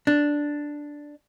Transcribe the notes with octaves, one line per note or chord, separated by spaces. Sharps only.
D4